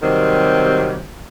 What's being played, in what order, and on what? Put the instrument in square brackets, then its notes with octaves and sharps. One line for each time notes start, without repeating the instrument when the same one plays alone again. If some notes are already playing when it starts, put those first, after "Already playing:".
[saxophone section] C3 D#3 F#3 G3 C4